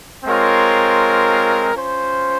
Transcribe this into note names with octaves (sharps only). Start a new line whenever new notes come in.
G#3 C4 F4 A#4 C#5
C#4 F4 C5